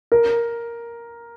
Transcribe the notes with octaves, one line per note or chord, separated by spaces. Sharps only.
A#4